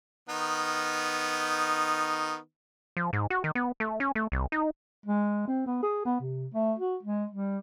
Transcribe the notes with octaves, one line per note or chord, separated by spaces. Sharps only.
D#3 B3 D#4
F3
G#2
F#4
D#3
B3
A3
C#4
A3
C2
D#4
G#3
C4
B3
G#4
B3
C3
A3
F#4
G#3
G3